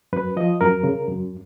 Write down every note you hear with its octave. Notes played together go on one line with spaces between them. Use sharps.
F#2 B4
F3 D#5
F#2 A#4
C#3
F#2